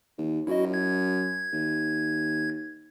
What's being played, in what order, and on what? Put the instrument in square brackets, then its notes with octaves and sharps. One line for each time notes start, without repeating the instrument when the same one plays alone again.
[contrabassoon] D#2
[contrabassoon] F#2 [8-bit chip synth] E4 F#4 D#5
[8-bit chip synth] G#6
[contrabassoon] D#2